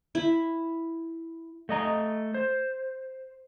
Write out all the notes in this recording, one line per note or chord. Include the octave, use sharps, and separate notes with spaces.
E4
A3 D#5 A#5
C5